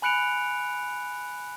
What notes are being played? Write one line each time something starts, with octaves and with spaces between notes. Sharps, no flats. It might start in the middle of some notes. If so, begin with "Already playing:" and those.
G#5 B5 F#6 C#7 D7 F7